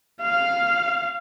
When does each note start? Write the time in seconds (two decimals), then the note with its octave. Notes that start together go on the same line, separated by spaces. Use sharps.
0.22 F5